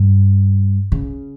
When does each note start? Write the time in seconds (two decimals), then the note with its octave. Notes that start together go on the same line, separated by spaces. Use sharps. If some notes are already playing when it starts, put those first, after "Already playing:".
Already playing: G2
0.92 C#3